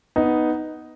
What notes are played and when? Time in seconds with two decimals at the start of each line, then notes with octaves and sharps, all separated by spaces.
0.16 B3 D#4